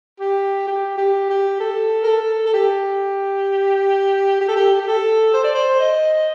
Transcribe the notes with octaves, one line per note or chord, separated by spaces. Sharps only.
G4
G4
G4
G4
A4
A#4
A4
A4
G4
G4
A4
G4
G4
A4
C5
D5
C5
D#5